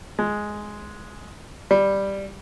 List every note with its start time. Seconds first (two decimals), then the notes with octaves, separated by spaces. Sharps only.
0.19 G#3
1.71 G3